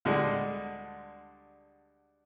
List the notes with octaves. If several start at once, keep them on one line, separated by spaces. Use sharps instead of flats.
D2 D3 G3 G#3